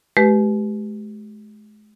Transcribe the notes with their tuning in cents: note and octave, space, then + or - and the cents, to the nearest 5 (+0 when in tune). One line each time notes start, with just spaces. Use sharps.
G#3 +40 G4 -20 B4 +0